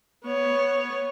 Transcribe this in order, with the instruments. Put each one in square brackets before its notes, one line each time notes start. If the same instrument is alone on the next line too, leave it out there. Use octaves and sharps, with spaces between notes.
[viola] B3 C#5